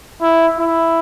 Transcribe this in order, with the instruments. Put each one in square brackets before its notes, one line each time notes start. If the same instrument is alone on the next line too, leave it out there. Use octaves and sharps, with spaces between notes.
[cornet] E4
E4